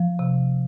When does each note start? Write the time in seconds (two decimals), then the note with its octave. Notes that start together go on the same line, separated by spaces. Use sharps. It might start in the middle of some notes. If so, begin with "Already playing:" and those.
Already playing: F3
0.19 C3